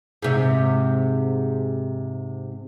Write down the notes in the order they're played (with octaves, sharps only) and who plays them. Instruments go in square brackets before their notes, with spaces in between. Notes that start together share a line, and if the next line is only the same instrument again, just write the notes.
[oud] G#2 C3